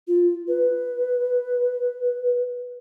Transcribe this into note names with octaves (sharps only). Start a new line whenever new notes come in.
F4
B4